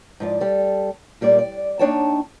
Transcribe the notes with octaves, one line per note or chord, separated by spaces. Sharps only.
G#2 F3 D5
G3 A4
A#2 G3 A#3 D5
D5
A#3 D4 D#4 C#5 G5 A5